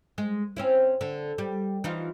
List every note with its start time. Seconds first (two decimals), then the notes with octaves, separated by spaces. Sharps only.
0.18 G#3
0.57 C4 C#4 E4
1.01 D3
1.38 G3
1.84 E3 D#4 F4